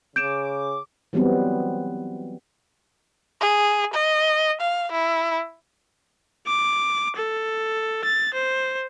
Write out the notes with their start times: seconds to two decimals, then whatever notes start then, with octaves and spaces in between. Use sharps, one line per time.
0.16 C#3 D6 G6 D7 E7
1.13 E3 F#3 G3 B3 C4
3.41 G#4
3.94 D#5
4.61 F5
4.92 E4
6.47 D6
7.16 A4
8.04 A6
8.34 C5